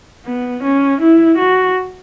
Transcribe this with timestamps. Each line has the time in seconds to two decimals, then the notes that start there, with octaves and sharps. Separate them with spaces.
0.26 B3
0.63 C#4
1.00 E4
1.37 F#4